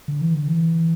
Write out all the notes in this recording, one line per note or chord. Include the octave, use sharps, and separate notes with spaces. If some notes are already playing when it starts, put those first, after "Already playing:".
D3
E3
D3
E3